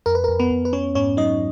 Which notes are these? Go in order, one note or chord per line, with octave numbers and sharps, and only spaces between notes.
F2 A#4
B4
F2 A#4
B3 B4
F2
B4
B3 C#4 C#5
G#2 C#4 C#5
F#3 D#4 D#5